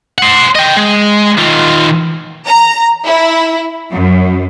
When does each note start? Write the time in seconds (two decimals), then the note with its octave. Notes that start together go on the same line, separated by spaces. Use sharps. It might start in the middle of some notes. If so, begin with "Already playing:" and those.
0.18 C5 F#5
0.56 D#5 G5
0.77 G#3
1.38 D#3 F4
2.46 A#5
3.06 E4
3.91 F#2